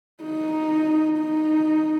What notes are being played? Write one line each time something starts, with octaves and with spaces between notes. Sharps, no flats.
D#4
D#4